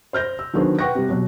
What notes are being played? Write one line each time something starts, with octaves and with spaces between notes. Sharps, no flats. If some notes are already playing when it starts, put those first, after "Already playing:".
C5 F6 G6 A#6
E6
D3 D#3 F#3 B3 G#4 C5
B4 F#5 G5 C#6 F#6 A#6
C3 G3
B2 F#3